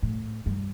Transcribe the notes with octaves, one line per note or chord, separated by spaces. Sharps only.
A2
G2